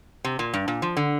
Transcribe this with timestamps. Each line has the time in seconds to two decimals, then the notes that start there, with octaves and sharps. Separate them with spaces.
0.24 C3
0.39 A#2
0.54 G2
0.68 A#2
0.82 F3
0.97 D3